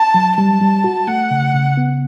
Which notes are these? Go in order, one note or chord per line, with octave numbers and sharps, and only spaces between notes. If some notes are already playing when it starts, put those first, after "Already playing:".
Already playing: A5
F#3
G3 A5
G3
F#4
A3 F#5
C#3
C#3
B3